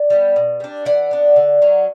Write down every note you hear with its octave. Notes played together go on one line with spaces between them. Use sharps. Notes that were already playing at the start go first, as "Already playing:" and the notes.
Already playing: D5
G3 B3
B2
G3 D4
E3 D5 F#5
B3 D4
D3
F#3 C#4